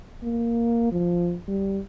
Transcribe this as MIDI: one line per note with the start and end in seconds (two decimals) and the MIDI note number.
0.23 0.89 58
0.92 1.36 53
1.48 1.80 55